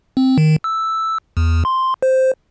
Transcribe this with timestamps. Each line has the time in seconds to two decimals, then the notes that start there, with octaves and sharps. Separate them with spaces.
0.17 C4
0.38 D#3
0.64 E6
1.37 E2
1.65 C6
2.03 C5